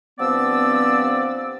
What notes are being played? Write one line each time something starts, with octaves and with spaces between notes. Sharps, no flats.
G2 F3 B3 C4 D5 E6